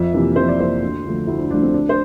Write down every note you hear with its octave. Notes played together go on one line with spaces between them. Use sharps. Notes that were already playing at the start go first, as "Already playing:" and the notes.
Already playing: F2 E5
C3 E3 A#3
F2 C5
D5
C3 E3 A#3 C5
D2
D3 F3 A3
D2 E4
D4
D3 F3 A3 D4
C4
D2 D4
C5